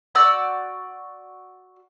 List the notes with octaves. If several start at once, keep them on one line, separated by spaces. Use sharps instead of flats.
F#4 D5 E6 G6